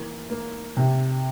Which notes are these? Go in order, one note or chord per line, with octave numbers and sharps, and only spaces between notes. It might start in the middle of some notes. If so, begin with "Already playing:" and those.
Already playing: E3 A#3
A#3
C3